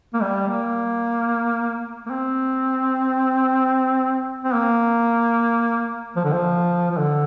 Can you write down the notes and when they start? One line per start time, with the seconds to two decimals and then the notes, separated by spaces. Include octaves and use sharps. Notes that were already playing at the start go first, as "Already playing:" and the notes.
0.14 A#3
0.22 G3
0.48 A#3
2.06 A#3
2.11 C4
4.44 C4
4.54 A#3
6.16 F3
6.25 D3
6.33 F3
6.91 F3
6.98 D3